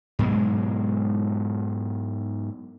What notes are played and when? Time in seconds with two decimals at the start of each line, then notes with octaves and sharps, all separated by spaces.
0.19 G#2 B2 F#3 G#3